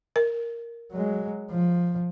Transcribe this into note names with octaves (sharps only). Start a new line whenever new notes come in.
A#4
F#3 G#3
F3